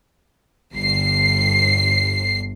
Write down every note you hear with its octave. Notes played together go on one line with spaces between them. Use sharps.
G1 C7